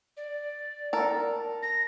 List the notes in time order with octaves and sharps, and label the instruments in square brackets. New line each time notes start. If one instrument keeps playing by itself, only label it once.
[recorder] D5
[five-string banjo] A4 A#4
[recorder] A#6